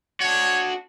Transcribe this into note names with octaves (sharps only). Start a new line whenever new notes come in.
D4 F#4 C#5